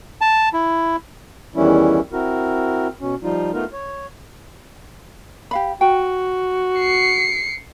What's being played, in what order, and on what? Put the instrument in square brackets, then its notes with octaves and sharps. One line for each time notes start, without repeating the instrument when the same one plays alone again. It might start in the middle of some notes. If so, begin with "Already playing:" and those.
[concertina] A5
E4
[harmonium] E2 D#3 E3 G3 C#4 E4
C4 E4 F#4 A#4
B2 C#4
F3 G3 D#4 F4
A3 B3 D#4 F4 A#4
C#5
[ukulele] G4 F5 B5
[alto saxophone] F#4 [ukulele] G5
[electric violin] C7 C#7